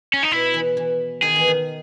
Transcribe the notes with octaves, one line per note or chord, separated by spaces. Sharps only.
C#4
D#4
B2 E4
E3
E3
D#3 G#4
E3
D#3